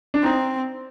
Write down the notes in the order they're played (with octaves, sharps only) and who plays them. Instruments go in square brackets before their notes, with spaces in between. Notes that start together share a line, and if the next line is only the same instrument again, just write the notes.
[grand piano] D4
[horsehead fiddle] C4 [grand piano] D#4